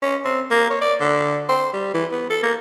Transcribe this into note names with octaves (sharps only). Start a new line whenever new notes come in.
C#4
C4
A#3
C#5
D5
D3
C5
G3
E3
B3
A4
A#3